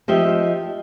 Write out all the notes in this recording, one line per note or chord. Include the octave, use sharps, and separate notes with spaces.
F3 G4 D#5 E5